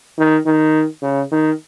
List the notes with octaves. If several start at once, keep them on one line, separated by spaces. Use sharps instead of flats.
D#3
D#3
C#3
D#3